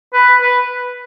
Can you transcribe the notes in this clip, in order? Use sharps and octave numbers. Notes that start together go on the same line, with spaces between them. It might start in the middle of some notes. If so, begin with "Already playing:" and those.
B4
B4